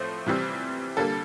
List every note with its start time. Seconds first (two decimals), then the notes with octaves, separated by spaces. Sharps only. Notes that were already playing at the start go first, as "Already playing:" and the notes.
Already playing: A2 F3 A3 C4 C5
0.26 C3 E3 G3 C4
0.97 D3 G3 A#3 A4